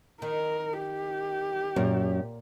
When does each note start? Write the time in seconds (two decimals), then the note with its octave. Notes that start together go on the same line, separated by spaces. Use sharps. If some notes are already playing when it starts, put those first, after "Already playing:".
0.22 D#3 A#4
0.80 G4
1.76 F#2 A#2 A#4